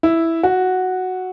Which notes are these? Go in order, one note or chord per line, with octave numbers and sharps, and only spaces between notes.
E4
F#4